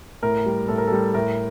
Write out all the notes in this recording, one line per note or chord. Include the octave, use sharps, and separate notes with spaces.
A2 A#4
G3
A2 A4
A#4
G3 A4
A2 A#4